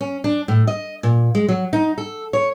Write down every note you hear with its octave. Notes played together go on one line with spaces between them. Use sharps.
C#4
D4
A2
D#5
A#2
G#3
F#3
D#4
A4
C#5